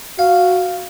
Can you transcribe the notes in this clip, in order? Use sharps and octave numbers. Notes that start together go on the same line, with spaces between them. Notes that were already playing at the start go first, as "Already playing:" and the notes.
F#4 F5